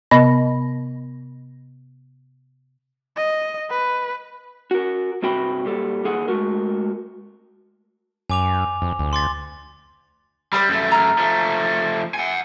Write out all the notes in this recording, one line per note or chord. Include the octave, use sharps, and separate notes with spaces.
C3 B3 D#5 B5 A#6
D#5
B4
F#4 A#4
G2 C3 F#4 G5 B5
A#2 G3 A4
D#2 G#4 F#5
G#3 A3 F#4 A#4
F#2 G#5 D6 F7
F2
D2
C6 D6 A6
G3 C5 E5 B5
F#2 A3
A#5 F6
F3 A3
F#5 G#5